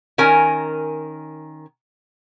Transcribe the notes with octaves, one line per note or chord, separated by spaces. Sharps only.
D#3 C#4 A#4 G#5